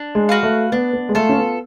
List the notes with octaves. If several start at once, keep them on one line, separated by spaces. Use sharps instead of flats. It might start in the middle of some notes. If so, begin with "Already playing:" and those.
Already playing: D4
G#3
F#4 B4 F5
A3
B3 D4
B3
G#3
A3 F4 A4
C#4
B3